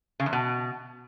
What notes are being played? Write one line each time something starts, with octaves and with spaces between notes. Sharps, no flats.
C#3
E2
B2